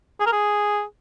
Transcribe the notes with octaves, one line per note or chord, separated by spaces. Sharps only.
G#4
A#4
G#4